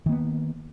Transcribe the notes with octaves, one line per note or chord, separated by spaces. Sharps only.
D#3 A#3 B3